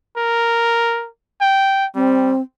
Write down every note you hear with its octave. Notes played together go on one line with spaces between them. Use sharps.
A#4
G5
G3 C4